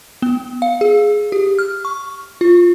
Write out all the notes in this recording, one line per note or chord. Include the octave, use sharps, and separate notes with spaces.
B3
F5
G#4
G4
F6
C#6
F4